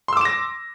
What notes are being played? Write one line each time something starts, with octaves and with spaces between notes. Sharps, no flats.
C6 D6 E6 A#6 E7